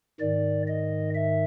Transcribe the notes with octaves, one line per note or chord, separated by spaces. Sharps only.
G#2 D#3 D5
D#5
E5